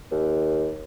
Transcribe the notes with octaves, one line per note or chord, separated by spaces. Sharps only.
D#2